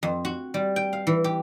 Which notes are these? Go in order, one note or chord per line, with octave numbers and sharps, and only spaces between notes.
F2
F#4
G3
G5
F5
E3
G4